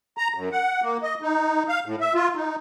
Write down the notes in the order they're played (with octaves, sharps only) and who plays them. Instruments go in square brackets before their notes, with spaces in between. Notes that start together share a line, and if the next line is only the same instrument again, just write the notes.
[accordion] A#5
F#2
F#5
A#3
D#5
D#4
F5
A2
E5
F4
D#4